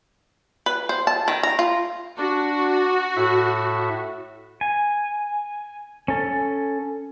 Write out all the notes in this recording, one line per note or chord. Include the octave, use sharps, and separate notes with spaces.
B4
C5
A5
D#3
A#5
F4
D4 F#4
A2 E5
G#5
C#4 A4